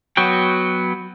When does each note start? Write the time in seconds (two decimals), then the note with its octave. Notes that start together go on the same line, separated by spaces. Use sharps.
0.17 F#3 B3 F#4 G5